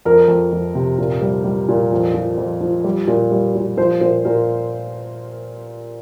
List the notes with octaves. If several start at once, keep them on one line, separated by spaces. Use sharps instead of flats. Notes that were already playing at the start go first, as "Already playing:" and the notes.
F2 A#4
F2
F2
C3
A#2
G3
G3
A#2
F2
F3
F2
F3
G3
A#2
G3
A#2
F3 C5
A#2 C5
A#2 A#4